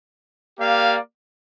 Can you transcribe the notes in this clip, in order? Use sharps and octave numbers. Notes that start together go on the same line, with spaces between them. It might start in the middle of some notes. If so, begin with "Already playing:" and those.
A#3 G4 D5 F5